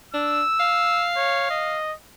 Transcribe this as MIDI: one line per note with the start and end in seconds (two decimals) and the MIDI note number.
0.14 0.42 62
0.14 1.11 88
0.60 1.77 77
1.16 1.46 73
1.50 1.94 75